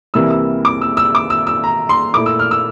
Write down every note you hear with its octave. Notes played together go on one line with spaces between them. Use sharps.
C2 C3 E3 G3 A#3 E6
E6
D6
E6
E6
D6
E6
E6
A#5
C6
A#2 A3 E4 D6
E6
F6
E6